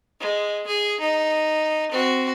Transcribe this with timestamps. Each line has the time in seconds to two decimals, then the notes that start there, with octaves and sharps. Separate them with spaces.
0.20 G#3
0.67 G#4
1.00 D#4
1.91 C4 F#4